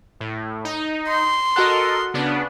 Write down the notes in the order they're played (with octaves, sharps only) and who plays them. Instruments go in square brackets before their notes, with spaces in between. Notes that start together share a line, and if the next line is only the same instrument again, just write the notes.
[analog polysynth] A2
D#4
[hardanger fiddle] C6
[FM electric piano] F#4 F#5 F#6 [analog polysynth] A4 A#4 D#5
[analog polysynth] C#3 B3 D4